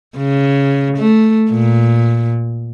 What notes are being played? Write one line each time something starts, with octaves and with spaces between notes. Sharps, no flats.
C#3
A3
A#2